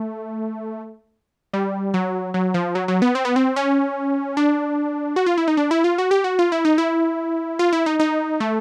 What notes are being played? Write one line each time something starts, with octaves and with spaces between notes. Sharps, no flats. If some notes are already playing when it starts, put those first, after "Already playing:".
Already playing: A3
G3
F#3
F#3
F3
F#3
F#3
B3
C4
B3
C4
C#4
D4
F#4
F4
E4
D#4
D4
E4
F4
F#4
G4
F#4
F4
E4
D#4
E4
F4
E4
D#4
D#4
A3